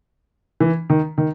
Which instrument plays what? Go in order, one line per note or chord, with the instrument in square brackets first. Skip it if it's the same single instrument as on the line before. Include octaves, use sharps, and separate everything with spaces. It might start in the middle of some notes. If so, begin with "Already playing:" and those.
[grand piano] E3
D#3
D#3